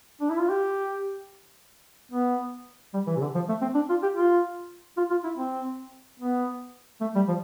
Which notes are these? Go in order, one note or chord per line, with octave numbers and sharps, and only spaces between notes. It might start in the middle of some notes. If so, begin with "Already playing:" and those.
D4
E4
F4
G4
B3
G3
E3
C3
D3
F3
A3
C4
D4
F4
G4
F4
F4
F4
E4
C4
B3
A3
G3
F3